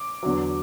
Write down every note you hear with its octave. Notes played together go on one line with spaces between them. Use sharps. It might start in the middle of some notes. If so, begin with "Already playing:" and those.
Already playing: D6
E2 D3 F#3